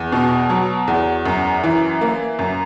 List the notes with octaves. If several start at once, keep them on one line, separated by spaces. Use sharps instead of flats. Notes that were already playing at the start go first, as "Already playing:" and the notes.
Already playing: E2
B2
F#3
E2
F#2
E3
A#3
F#2